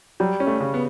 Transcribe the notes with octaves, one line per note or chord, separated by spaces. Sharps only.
F#3 G3
C#4
A3
C#3
B3